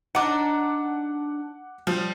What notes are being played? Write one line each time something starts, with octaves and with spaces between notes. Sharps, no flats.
D4 D#4 F#5 D6
F3 G3